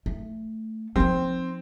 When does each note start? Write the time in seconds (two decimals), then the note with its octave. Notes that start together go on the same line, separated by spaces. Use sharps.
0.06 A3
0.96 F3 C4 D#4